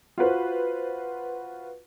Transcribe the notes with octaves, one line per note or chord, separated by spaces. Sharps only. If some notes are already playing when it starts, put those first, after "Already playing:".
F4 F#4 B4 C5